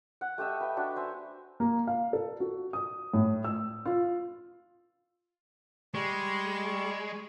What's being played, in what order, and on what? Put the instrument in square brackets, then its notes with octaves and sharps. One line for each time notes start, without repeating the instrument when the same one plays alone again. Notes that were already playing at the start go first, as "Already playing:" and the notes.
[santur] F#5
A3 G4 D#5 E5
B4 G5
D4 F#4 A5
C5 E5 G#5 A#5
[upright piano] A#3
F5
A4
F#4
D#6
A2
E6
F4
[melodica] G3 C#6 [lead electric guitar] G#3